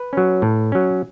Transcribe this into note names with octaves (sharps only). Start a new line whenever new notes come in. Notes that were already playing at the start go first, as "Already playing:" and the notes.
Already playing: B4
F#3 C#4
A2
F#3 C#4